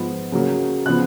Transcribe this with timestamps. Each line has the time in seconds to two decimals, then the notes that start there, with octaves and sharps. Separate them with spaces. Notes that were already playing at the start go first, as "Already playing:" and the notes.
Already playing: G#2 F3 B3
0.32 C#3 F#3 A#3
0.86 C#3 F3 B3 F#6